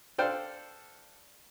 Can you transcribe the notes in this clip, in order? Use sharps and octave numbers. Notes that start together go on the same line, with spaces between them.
D4 A4 C5 F5 G5